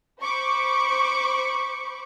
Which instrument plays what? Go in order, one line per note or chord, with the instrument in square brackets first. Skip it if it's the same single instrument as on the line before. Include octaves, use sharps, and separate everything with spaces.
[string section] C5 B5 C#6 D6